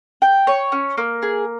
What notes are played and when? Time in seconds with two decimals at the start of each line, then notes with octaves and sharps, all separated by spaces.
0.22 G5
0.47 C#5
0.72 C#4
0.98 A#3
1.22 G#4